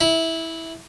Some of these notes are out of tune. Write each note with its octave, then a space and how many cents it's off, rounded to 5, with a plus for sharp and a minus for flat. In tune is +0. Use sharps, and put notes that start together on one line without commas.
E4 -15